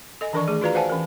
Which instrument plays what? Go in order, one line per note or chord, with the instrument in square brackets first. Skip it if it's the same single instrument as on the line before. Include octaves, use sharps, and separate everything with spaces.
[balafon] A4 D#5 G#5
D#3 E3 D4 A#4 D5 C#6
A3 G#4
F4 F#4 B4 D5 F5 A#5
B4 C5 F5 F#5 G#5 A5
E3 C#4 A#4